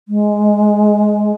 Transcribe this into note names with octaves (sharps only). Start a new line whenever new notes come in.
G#3